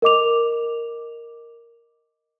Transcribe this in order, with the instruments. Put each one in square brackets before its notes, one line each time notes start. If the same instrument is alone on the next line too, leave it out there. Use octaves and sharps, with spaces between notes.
[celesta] A#4 D#5 D6 F7